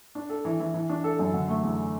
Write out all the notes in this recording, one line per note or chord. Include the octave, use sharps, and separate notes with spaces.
D4
A4
E3
E3
E3
D4
A4
F#2
D3
A3
E2